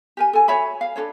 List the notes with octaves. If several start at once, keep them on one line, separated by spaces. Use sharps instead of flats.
G4 A#4 G#5
A4 G#5
F#4 C#5 E5 B5
F5
D4 F#4 A4 C#5